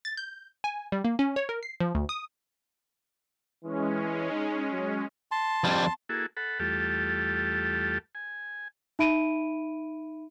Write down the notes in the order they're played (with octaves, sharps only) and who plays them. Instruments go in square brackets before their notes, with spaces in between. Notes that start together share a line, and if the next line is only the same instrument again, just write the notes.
[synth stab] A6
G6
G#5
G3
A#3
C#4
C#5
A#4
C7
F3
D2
D#6
[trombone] E3 [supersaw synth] G#3 C#4
[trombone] D#4
F#3
[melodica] A5 C6
[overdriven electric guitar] F2 G3
[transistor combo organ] A#3 E4 F#4 G#4 A4
A4 F#5 B5
E2 G3 A3 F4 G4 A4
G#5
[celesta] D#4 E5 B5 D7 D#7